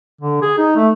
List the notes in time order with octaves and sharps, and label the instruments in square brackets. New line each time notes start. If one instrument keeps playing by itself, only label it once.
[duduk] D3
G#4
D#4
A3